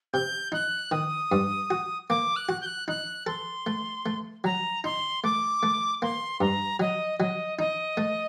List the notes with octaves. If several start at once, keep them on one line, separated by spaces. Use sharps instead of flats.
C3 G6
D#4 F#6
D#3 D#6
G2
F#4
A#3 D6
F#6
F#4
G6
F#6
D#4 F#6
A4 C6
A3
A3
F#3 A#5
D#4 C6
A3 D6
A3
A#3 C6
G2 A#5
F#3 D#5
F#3 D#5
D#4 D#5
A3